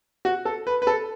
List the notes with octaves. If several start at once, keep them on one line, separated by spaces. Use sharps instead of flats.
F#4
A4
B4
B4
A4